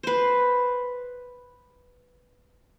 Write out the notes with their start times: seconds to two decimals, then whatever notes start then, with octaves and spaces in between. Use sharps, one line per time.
0.03 B4 C5